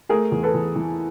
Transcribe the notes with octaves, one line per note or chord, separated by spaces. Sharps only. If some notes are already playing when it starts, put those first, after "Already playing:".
A3 G#4 A#4
E2
A4 B4
E2
E3